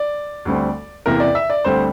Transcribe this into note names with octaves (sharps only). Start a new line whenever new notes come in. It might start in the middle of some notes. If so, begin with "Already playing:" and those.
Already playing: D5
D2 D3 G3 C4
E2 C3 E3 A#3 A#4
D5
E5
D5
D2 D3 G3 C4 C5